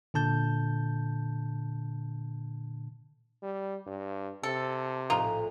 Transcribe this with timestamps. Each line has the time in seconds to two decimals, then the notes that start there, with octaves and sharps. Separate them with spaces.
0.14 A#2 D3 A5 G6
3.42 G3
3.87 G2
4.43 C3 A4
5.10 A#1 A2 D#4 F4